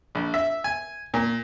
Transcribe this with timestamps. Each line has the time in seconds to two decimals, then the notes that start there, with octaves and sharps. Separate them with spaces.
0.15 A#1
0.34 E5
0.64 G#5
1.14 A#2